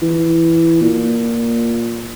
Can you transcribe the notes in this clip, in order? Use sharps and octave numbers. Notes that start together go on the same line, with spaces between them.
E3
A#2